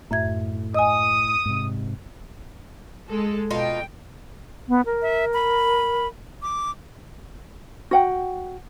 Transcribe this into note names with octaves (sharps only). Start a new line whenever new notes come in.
F#2 A2 E5 G#6
D#5 G#5 D#6
G#2 C3
G#3 A4
B2 D#4 F4 A4 G5
B3
A#4
E5
B5
D6
F#4 F#5 G5